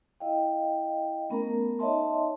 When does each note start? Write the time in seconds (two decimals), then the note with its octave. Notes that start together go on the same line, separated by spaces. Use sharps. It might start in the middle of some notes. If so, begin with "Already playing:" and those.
0.20 E4 D#5 F5 G5
1.30 A3 B3 C#4 A#4 A#5
1.79 D#4 C#5 D#5 E5 A5 C6